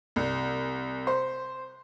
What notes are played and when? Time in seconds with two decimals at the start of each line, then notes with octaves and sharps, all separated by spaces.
0.16 C2
1.07 C5